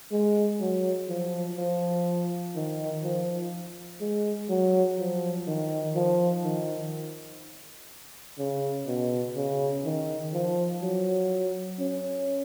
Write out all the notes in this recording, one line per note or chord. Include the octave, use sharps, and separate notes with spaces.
G#3
F#3
F3
F3
D#3
F3
G#3
F#3
F3
D#3
F3
D#3
C#3
B2
C#3
D#3
F3
F#3
C#4